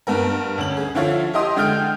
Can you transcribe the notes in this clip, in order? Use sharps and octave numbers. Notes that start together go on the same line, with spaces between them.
G2 B3 A#4
D2 C#4 F#7
G#4
D3 F3 E4 F4 C#5
E4 G4 D#5 G5 C6 D#6
D3 G#3 G5 F6 G6 D7